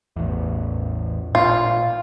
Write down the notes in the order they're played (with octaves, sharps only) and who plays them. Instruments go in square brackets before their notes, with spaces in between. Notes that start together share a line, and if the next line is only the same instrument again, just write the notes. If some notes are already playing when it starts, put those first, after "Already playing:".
[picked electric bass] A1 E2
[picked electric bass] A#2 [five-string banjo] F4